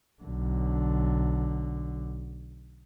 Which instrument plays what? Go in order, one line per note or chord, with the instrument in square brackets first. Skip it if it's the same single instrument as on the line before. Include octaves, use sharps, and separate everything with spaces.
[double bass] B1 D3